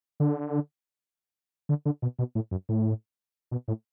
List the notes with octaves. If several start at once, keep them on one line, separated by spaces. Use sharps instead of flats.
D3
D3
D3
B2
B2
A2
F#2
A2
B2
A2